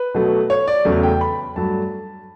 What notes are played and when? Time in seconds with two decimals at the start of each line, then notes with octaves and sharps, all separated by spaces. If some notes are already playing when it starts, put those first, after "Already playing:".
Already playing: B4
0.14 B2 F#3 A3
0.50 C#5
0.68 D5
0.85 E2 C#3 F#3 A3
1.03 G5
1.21 B5
1.56 G2 F#3 A3 A5